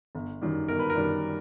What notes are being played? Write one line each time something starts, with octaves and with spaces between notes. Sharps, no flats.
G1
F#2 D#3 G3
G1 A#4
B4
A#4
F#2 D#3 G3